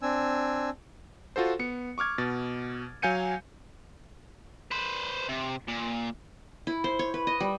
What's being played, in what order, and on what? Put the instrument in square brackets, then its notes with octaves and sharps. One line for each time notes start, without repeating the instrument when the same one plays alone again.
[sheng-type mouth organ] C4 D4 G#5 E6
[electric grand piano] F4 F#4 A4 C5
B3 C#7
C#6 D6 F6 G#6
B2 A6
F#3 F5 G#5 G6 C#7 D#7
[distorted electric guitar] B4 C5
C3
A#2
[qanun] E4
C5
C#5
B4
D#5
G3